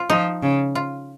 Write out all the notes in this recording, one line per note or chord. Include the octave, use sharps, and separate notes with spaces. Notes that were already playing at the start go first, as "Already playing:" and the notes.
Already playing: F4
F3 D#4
C#3
F4